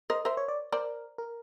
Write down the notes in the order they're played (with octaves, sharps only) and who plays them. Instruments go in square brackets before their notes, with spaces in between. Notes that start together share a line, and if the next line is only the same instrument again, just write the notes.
[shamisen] A#4 C5 [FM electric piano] D#5
[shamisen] A#4 C5 [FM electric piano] E5
[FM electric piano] C#5
D5
[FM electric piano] A#4 [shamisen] C5 D5
[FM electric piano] A#4